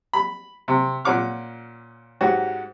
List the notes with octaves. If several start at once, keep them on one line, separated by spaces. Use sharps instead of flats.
B5
C3
A#2 C#4 F#5 D6 F6
G#2 C#4 F#4 G4